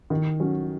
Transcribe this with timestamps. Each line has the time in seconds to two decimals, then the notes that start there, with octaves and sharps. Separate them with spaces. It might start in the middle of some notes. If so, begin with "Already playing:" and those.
0.10 D#3
0.40 F#3 C#4